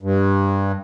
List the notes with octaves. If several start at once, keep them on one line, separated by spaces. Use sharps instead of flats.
G2